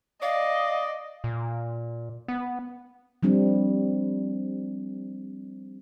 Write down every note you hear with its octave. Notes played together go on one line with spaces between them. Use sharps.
D5 D#5 F5
A#2
B3
F3 G3 C4 D4